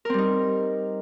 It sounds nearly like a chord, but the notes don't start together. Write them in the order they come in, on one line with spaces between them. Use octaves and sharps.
A#4 C4 G3 D#4